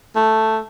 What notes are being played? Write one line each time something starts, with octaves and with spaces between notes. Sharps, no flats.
A3